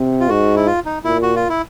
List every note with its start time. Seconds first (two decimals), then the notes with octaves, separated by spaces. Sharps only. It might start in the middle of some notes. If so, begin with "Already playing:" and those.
Already playing: C3
0.20 F4
0.29 G#2 F#4
0.56 E4
0.67 F4
0.86 D#4
1.04 A#2 E4
1.22 F#4
1.35 F4
1.49 E4